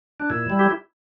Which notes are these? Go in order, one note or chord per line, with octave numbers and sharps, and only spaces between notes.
D4
A#2 E4
G3
G4